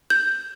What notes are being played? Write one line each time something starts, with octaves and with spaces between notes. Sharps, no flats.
G6